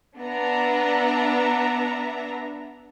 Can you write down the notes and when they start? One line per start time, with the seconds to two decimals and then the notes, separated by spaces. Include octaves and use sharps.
0.19 B3 D4 E5 A#5